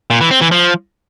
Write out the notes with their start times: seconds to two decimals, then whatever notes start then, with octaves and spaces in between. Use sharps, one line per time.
0.10 A#2
0.21 E3
0.31 C4
0.41 E3
0.52 F3